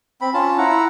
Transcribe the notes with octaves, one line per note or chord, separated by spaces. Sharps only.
C4 B5
C#4 F4 A5
E4 F#5 A#5